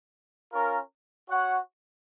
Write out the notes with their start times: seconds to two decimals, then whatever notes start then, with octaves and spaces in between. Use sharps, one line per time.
0.52 C#4 F4 A#4
1.30 F#4 C#5 F#5